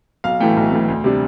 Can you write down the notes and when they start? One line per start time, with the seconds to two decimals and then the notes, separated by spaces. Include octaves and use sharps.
0.24 B1 F5
0.40 A2 E3 A3 G5
0.57 B1
0.72 A2 E3 A3
0.88 D2
1.04 C3 G3 D4